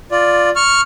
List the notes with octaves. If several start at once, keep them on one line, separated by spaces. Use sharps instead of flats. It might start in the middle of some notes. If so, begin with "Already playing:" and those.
F4 D5
C#6 F6